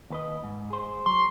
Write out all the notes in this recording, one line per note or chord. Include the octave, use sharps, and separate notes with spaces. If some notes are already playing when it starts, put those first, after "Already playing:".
D#2 B4 D#5
G#2
G#4 C5
F#3 C6